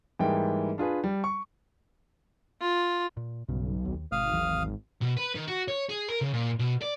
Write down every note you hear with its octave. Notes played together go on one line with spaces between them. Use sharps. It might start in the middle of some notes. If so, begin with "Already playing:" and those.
G#2 E3 G3 A#3 G5
D4 F4 G#4 B4
G3
C#6
F4
A#2
B1 G2 C#3
D#2
G#1 B2 F5 D#6 F6
D#2 E3 F#3
B2
B4
D#3
F#4
C#5
G#4
A#4
C#3
A#2
B2
D5